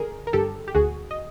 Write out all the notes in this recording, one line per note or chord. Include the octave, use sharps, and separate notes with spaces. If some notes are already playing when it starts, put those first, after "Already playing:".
Already playing: D3 G#4 A#4
A#4
G2 G4 A4
G4
D2 F#4 G#4
D#5